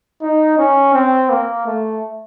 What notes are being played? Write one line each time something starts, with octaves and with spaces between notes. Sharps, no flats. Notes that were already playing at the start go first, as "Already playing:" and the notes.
D#4
C#4
C4
A#3
A3